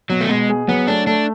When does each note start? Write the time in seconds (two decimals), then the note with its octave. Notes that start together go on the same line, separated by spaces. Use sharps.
0.10 B2 F#3
0.21 A3
0.29 B2 G#3
0.50 G#4
0.68 F#3 B3
0.88 A3 D4
1.07 A3 D4